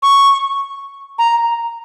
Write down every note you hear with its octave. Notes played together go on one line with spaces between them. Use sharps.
C#6
A#5